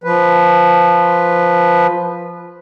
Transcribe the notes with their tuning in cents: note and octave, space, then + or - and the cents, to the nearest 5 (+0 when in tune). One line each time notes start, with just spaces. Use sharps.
F3 +0 B4 +0